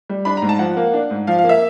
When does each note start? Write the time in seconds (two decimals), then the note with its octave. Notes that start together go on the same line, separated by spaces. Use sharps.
0.09 G3
0.25 D4 B5
0.37 A#5
0.42 G#2
0.49 A5
0.59 F3 F#5
0.77 A#3
0.94 D4
1.11 G#2
1.27 F3 F5
1.38 F5
1.44 A#3
1.49 E5